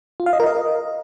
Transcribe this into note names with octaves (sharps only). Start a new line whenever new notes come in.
F4
F5
D#5
A#4
D#5